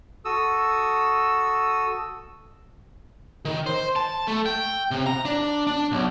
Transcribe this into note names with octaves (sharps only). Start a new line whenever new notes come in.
F#4 A4 D#6 E6
D#3
C5
A5
A3
G5
C3
A#5
D4
D4
B1